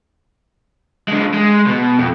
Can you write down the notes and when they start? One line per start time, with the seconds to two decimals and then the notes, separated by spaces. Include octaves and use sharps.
1.08 D3 G#3
1.34 G#3
1.66 B2
1.99 F2